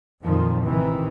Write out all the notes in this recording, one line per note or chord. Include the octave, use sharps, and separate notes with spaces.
F2 A#2 D#3 F3
A1 C3 D#3 E3